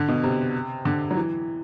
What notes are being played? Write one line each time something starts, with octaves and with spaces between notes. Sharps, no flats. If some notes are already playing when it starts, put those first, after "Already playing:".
Already playing: D3
B2
C3
D3
F#3
E3